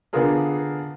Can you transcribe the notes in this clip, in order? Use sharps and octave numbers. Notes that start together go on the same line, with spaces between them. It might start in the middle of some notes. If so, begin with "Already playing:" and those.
D3 B3 D4 F4 G#4 A#4